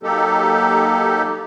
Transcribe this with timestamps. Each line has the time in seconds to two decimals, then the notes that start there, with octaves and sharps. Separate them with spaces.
0.03 F#3 A#3 D#4 G4 A4